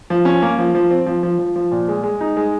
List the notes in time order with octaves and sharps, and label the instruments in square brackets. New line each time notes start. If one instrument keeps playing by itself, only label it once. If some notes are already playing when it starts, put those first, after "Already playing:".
[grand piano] F3
C#4
A#3
F3
F3
C4
F3
F3
F3
F3
A#2
G#3
G#3
D#4
G#3